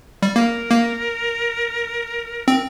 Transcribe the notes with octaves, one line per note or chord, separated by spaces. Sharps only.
G3
A#3 A#4
A#3
C4